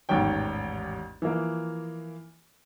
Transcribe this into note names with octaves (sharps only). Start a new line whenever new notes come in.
A1 E2 G#2 D#3 C#5 G5
E3 F3 A#3